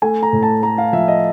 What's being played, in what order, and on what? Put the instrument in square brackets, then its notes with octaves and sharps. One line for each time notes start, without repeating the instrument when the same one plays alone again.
[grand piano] A3 G#5
A#5
A2
A5
A3 A#5
F5
F3 E5
D#5